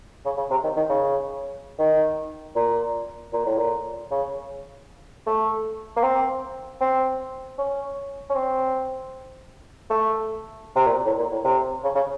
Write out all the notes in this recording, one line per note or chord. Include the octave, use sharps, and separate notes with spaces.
C#3
C#3
C3
D#3
D#3
C#3
D#3
A#2
A#2
A2
A#2
C#3
A3
A#3
C4
C4
C#4
C#4
C4
A3
C3
A#2
A2
A#2
A2
C3
C#3
C#3